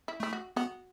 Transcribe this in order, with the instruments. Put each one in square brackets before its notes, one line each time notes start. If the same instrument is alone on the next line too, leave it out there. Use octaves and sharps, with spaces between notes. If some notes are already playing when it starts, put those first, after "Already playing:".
[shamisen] E4
[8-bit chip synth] A3 [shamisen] E4
[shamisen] F#4
[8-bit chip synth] B3 [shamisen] F#4